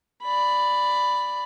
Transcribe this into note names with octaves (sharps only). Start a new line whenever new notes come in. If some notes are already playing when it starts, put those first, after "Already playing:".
D5 B5